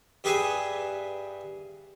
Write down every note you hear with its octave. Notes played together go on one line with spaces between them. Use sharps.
G2 G4 G#4 B4 E5 G#5